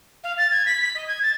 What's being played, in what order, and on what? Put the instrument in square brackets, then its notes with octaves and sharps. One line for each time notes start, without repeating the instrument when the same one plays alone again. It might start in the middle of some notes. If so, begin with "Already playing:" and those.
[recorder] F5
A6
G#6
B6
B6
D#5
G#6
A6